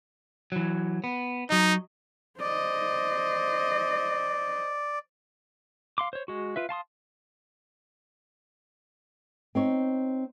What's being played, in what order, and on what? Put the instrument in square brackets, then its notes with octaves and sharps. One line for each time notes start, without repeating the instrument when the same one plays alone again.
[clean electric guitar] E3 F#3
B3
[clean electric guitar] F#3 D#5 [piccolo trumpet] D#4
[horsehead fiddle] C5 D#5 [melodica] D5
[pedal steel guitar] F5 C6 D6
C5 C#5
G#3 F#4
F4 B4 E5
F5 A5 C6 D#6
[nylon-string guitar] C4 D#4 C#5